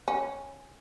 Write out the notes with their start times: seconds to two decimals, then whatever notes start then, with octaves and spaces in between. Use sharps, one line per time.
0.08 C#4